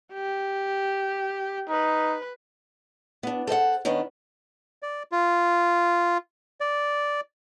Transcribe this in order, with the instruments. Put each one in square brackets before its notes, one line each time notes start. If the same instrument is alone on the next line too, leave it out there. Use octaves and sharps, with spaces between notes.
[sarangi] G4
[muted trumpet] D#4 [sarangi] B4
[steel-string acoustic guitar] B3 D4
A4 C5 D#5 F#5
D#3 B3 C#4 D4
[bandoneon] D5
F4
D5